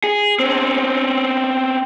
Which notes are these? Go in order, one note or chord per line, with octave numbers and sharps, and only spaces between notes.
G#4
C4 C#4